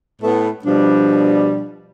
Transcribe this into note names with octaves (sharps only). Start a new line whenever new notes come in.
A2 A3 B3
B2 F3 G3 D4